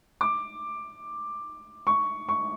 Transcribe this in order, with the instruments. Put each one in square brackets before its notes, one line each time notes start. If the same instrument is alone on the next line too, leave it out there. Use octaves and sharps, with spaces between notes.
[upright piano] D6
C#6
C#6